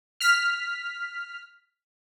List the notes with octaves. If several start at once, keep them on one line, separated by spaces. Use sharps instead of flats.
F6 B6